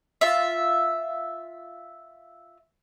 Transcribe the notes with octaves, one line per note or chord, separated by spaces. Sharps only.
F4 E5